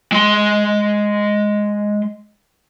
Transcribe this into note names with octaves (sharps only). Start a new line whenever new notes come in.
G#3 C6